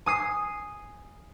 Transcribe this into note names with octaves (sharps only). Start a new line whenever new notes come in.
G#5 D#6 C7